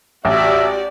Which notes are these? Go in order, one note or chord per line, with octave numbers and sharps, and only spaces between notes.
A1 F#4 G4 D5 E5